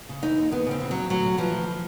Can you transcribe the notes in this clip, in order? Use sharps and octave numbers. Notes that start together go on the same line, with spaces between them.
C#3
E3 D#4
D#2
D#2 B3
C#3 C4
E3
D#2 F#3
D2 F#3
C3
E3 F3
D2